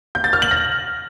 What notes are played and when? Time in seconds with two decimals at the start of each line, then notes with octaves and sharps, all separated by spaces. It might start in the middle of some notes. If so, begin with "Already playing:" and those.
0.15 G6
0.24 A6
0.33 F6
0.42 F#7
0.51 A#6